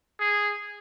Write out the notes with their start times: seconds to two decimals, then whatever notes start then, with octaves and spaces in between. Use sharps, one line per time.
0.20 G#4